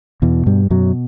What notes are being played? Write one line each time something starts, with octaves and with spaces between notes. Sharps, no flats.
E2 B2 E3
G2 G3
F#2 B2 F#3